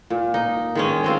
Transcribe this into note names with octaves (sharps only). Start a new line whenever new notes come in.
A#2
D#4
D#3 G#3 C#4
G#3 C4 F4